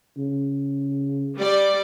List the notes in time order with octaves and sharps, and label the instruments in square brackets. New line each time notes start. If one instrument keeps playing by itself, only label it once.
[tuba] C#3
[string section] G3 D5